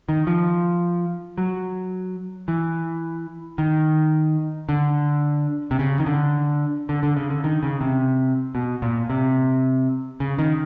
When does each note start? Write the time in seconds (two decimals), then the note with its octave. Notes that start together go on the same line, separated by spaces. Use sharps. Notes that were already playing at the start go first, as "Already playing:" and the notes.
0.09 D#3
0.27 F3
1.38 F#3
2.48 E3
3.58 D#3
4.69 D3
5.71 C3
5.79 C#3
6.00 D#3
6.06 D3
6.89 D3
7.03 D3
7.17 C#3
7.30 D3
7.44 D#3
7.63 C#3
7.81 C3
8.55 B2
8.82 A#2
9.10 C3
10.20 C#3
10.39 D#3